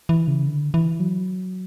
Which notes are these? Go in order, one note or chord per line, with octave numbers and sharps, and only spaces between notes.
E3
C#3
D3
E3
F#3